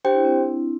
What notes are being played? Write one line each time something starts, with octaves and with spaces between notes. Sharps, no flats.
D4 G4 C5 G5
E4
C4